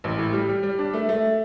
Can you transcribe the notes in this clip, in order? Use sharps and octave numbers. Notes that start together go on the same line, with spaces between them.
A1
A2
G3
G3
G3
D4
A3
A3